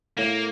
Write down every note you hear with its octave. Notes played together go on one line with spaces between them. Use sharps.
A2 A#3